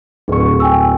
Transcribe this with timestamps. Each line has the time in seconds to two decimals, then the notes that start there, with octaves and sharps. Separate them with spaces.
0.28 D1 G#4 B4 C#6
0.60 G5 G#5 E6